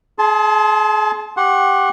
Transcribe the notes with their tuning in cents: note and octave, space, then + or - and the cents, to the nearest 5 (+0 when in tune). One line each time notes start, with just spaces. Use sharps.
G#4 +30 A5 -20 C6 +0
G4 +0 F#5 +0 C#6 -45